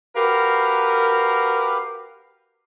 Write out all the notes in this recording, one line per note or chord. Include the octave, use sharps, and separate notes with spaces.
F#4 G4 A#4 B4 F5